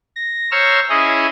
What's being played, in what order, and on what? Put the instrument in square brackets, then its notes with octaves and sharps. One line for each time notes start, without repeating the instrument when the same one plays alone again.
[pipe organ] A#6
C5 C#5 A#5 C#6 E6 F6
C#4 E4 G#4 D#5